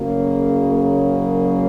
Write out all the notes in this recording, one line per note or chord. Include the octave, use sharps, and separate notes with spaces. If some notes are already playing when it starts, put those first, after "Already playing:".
Already playing: F#1 F#2 C#3 F#3 A#3
A#3